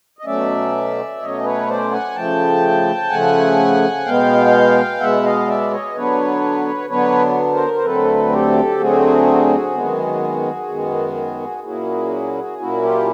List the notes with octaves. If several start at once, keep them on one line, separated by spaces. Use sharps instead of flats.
D#5
B2 F#3 A3 C#4 D5 E5
B2 F#3 A3 C#4 C#5 D#5
B4 C#5
C5 D5
F#5 G#5
C#3 F3 A3 G5 A5
C#3 F3 A3 F#5 G#5
B2 G#3 B3 F5 G5
B2 G#3 B3 E5 F#5
D#5 F5
D5 E5
C#5 D#5
D3 F#3 B3 D4 B4 C#5
D3 F#3 B3 D4 B4 C#5
A#4 C5
C5
D2 D3 F#3 A3 C4 A4 B4
G4 A4
D2 D3 F#3 A3 C4 F#4 G#4
F#2 D#3 G#3 B3
F#2 D#3 G#3 B3
A#2 F#3 A#3 C#4 E4 F#4 G#4
A#2 F#3 A#3 C#4 E4 F#4
F4 G4